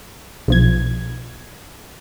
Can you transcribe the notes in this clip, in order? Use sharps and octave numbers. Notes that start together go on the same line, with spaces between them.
B1 F3 G#6